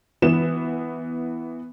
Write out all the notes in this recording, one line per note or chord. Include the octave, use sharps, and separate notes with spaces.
E3 B3 E7